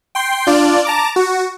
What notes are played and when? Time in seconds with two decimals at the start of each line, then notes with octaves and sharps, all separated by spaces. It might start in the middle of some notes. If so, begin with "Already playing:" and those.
0.15 G5 C6
0.47 D4 F4 D5
0.85 A5 A#5 D6
1.16 F#4